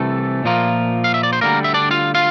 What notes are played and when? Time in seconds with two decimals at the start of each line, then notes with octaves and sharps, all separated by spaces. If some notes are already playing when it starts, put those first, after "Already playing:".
Already playing: C2 C3 E3 A3 A4
0.44 A#2 F3 A#3 F4
1.04 F5
1.14 E5
1.23 D5
1.33 C5
1.41 D2 D3 G3 A#3 A#4
1.64 E5
1.74 D4 D5
1.91 F4 F5
2.15 F4 F5